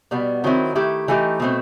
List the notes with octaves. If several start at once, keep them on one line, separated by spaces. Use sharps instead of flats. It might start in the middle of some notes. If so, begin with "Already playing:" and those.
B2 G3 B3
D#3 F#3 C4 E4
D#3 A3 E4 G4
E3 A3 D#4 G4
B2 A3 C4